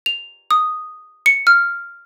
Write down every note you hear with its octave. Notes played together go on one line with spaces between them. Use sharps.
F7
D#6
C#7
F6